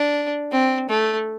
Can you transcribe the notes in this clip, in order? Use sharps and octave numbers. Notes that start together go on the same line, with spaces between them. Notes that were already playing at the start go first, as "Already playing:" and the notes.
Already playing: D4
C4
A3